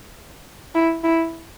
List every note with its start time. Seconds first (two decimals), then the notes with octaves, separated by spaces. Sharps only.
0.75 E4
1.04 E4